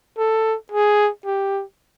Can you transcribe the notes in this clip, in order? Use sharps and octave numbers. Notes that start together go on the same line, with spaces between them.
A4
G#4
G4